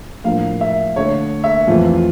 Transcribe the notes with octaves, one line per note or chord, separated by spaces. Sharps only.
A2 F3 A#3 D4 F5
E5
D3 A3 D4 C#5
E5
F2 E3 A3 F4
F4